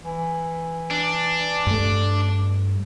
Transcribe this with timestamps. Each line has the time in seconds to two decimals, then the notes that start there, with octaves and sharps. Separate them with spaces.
0.02 E3
0.91 D4
1.67 G2 A3